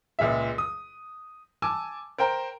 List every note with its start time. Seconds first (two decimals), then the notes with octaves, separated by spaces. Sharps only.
0.19 C#2 A#2 G#3 E5
0.58 D#6
1.62 G#5 A5 D6 E6
2.18 A#4 C5 G5 A#5